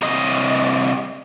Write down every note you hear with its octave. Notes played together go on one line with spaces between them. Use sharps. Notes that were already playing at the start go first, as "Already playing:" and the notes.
C2 D#5